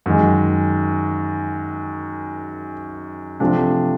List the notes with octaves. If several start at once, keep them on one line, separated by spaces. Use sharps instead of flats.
F#2 D#3 G#3
C3 F3 A3 D4